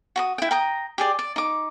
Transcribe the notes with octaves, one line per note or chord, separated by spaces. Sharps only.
F#4 A#5 D#6
E4 G5
G5 A#5 D#6
G4 G#4 D5
D5
D#4 D6